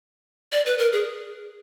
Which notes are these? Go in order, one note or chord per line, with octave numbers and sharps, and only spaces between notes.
D5
B4
A#4
G#4